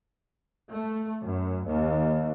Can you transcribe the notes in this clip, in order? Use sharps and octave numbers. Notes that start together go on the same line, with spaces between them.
A3
F#2
D#2